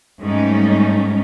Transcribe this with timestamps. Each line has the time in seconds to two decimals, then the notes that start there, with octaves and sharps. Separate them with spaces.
0.19 G#2 G3 A3 C#4 D#4